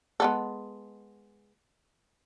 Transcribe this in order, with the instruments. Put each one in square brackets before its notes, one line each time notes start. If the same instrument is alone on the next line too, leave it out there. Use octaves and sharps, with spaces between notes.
[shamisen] G#3 B3 A4